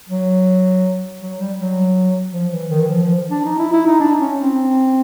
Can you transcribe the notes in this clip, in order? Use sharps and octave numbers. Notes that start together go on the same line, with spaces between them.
F#3
F#3
G3
F#3
F3
E3
D#3
E3
F3
F3
D4
D#4
E4
E4
D#4
D4
C#4
C4